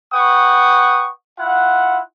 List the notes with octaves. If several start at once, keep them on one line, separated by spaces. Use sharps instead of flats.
B4 F#5 G5 C#6 D#6
E4 F4 F#5